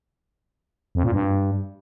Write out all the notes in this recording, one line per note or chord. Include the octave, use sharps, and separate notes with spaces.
F2
A#2
G2